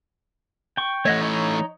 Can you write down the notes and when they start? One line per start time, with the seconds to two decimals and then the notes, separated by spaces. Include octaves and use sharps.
0.77 G5 C#6
1.05 E3 A3 C#5 D#5 F#5
1.21 D#4 C#5